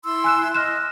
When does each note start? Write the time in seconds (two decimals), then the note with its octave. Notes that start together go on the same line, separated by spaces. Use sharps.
0.05 E4 C6 E6
0.24 G#5 F#6 E7
0.55 D#5 F6 F#6 E7